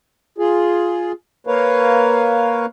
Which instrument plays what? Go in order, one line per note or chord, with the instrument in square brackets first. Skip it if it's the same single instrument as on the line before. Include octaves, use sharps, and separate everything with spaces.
[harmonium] F4 G#4
A#3 A#4 B4 C#5 F5